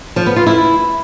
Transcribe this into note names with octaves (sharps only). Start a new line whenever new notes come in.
F3
B3
F4
E4